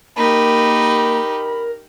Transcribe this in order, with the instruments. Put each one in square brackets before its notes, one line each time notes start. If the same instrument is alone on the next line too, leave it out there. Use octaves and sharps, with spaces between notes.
[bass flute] A#3 [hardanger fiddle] D#4 G4 [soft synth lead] A#4 [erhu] B5